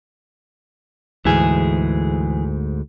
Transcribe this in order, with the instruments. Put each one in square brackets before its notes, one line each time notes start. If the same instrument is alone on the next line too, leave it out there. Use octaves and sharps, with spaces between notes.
[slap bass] D2 G#2 [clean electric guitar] E3 G#4